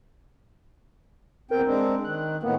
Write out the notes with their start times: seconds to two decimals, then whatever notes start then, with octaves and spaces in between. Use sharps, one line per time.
1.51 E2 C4 A#4 G5
1.66 G#3 C4 D4
2.05 D#3 F#6
2.43 A2 D#3 A#3 B3